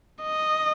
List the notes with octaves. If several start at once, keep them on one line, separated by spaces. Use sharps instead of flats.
D#5